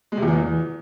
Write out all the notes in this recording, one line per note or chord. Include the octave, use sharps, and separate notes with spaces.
G#3
C3
E2
E3
E2